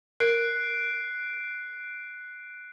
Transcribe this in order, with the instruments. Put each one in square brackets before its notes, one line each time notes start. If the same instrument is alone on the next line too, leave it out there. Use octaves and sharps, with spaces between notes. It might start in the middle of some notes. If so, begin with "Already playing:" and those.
[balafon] A#4 [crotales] F#6 C7 D7